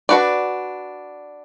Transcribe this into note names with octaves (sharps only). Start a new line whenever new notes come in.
D4 F#4 B4 D5